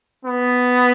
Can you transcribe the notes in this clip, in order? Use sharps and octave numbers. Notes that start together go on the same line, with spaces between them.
B3